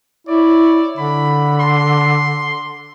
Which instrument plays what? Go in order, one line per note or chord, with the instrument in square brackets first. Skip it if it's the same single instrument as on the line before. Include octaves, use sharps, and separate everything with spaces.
[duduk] E4 [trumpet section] C#5 D5
[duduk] D3 [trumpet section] B5
[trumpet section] C6